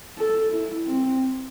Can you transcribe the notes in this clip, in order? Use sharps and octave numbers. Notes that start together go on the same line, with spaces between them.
A4
E4
C4